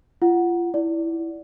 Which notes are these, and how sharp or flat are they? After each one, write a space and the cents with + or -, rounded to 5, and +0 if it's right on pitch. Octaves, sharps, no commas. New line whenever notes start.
F4 -30 F#5 +0
E4 +0 D5 -10